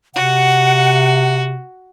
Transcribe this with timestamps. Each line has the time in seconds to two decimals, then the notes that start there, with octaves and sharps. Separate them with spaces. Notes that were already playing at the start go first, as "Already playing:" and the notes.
0.15 C3 F#4 F#5